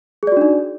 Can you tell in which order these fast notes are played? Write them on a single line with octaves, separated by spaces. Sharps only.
G#4 D5 F#4 D4 D#4